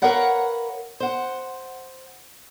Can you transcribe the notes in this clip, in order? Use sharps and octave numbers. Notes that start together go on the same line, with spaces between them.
A#4 B4 C#5 F5 F#5 A#5
C5 F#5